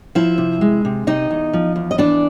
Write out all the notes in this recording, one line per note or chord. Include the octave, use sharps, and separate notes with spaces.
F3 E4 E5
C3
G#3
C3
C3 D#4 D#5
E2
F3
E2
D#5
E3 D4 D5